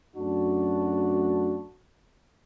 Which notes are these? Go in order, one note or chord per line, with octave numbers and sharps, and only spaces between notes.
F#2 A3 D4 F#4